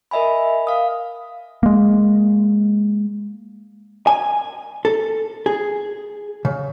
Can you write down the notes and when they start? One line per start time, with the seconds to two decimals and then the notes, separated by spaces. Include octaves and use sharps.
0.11 A#4 D#5 E5 G#5 B5
0.67 F5 D#6
1.63 G#3 A#3
4.07 G#5
4.85 A4
5.46 G#4
6.45 C#3